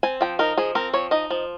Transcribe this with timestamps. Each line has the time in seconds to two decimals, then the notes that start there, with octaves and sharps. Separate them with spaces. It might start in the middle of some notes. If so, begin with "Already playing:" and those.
0.03 C4 G#5
0.21 F3 G5
0.39 D#4 A#4
0.57 F3 G#4
0.75 C4 A#4
0.93 F3 C#5
1.11 D#4 D#5
1.30 F3